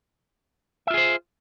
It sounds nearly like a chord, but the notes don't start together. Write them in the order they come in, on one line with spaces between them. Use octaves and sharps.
E5 F4 G#4 C5